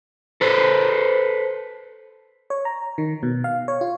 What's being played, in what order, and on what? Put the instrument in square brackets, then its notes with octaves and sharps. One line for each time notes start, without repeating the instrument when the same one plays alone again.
[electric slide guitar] A4 B4 C5
[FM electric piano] C#5
A#5
D#3
B2
F5
C#5
F4